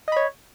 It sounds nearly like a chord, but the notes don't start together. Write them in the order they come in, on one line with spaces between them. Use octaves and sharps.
D#5 B5 C#5